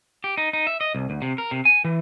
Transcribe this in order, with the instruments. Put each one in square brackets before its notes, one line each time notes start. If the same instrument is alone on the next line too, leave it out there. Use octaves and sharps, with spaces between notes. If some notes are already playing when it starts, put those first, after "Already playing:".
[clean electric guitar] G4
D#4
D#4
E5
D#5
C2
D2
C3
A#4
C3
G#5
E3